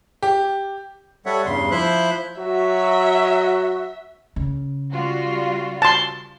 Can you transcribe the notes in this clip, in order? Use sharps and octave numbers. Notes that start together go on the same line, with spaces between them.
G4
G3 A4 C#5 E5 F#5
E2 G2 C#3 C6
F3 E4 C5 E5 F#6 G6
F#3 F#4 E5
C#3
G3 F4 F#4
A5 C6